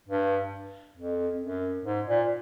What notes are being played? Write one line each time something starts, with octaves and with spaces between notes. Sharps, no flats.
G2
F2
F#2
G#2
A#2